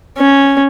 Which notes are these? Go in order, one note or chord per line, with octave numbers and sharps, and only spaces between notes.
C#4